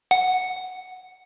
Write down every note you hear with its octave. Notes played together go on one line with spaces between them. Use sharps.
F#5